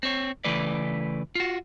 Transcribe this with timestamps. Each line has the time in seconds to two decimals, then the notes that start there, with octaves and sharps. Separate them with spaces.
0.03 C4 C#5
0.44 C#3 E3 A3 B4 D5
1.35 F4 F#4